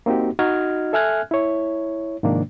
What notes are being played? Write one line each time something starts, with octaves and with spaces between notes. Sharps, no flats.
A#3 C4 D#4 F#4 G4
D#4 F#4 D#5 F6 G#6
A4 E5 G#5 F6 F#6 G#6
E4 C#5
G#2 C3 D#3 F3 A#3 D4